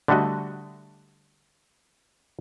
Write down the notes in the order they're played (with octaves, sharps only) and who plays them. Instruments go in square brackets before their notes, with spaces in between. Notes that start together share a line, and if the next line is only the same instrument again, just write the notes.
[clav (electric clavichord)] D3 G3 A3 F#4 D#5